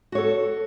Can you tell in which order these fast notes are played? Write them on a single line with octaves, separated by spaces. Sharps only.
F#4 C#5 A4